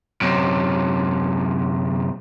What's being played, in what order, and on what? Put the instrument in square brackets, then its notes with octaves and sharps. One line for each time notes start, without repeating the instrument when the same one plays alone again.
[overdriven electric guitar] F#2 C3